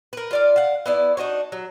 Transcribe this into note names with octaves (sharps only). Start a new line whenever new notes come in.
A#4 B4
F4 D5 F5
F5 F#5
B3 E4 D5
D4 D#4 F#4 C#5
F#3